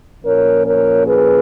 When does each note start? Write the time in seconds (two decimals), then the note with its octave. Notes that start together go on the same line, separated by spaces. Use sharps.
0.24 A#2 F3 A#3 C#4 A#4 C#5
0.66 A#4 C#5
1.07 G#4 B4